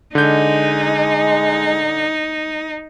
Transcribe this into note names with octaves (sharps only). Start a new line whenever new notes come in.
D3 G#3 D#4 G6